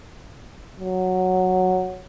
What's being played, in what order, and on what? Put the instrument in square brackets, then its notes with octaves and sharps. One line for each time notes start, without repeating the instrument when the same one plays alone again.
[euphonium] F#3